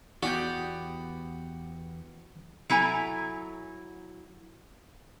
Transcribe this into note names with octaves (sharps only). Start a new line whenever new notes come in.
E2 B3 E4 F#4 G4 D5 G6
F#3 E4 A4 G#5 A#5